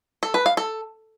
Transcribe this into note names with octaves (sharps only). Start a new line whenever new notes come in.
A4
B4
F5
A4